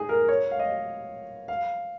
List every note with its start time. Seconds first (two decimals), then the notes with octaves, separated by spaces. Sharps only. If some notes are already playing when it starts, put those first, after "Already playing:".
Already playing: D#4 G#4
0.09 A#4
0.29 C#5
0.51 F5
0.59 D#5
1.48 F5